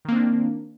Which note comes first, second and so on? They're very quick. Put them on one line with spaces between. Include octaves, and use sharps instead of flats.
D#3 A#3 C4 D4